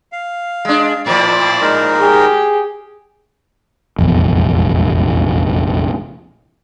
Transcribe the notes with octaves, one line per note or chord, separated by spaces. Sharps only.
F5
G#3 D4
A2 F3 E4 D5
G#3 D#4 A#4
G4 G#4
F1 A#1 E2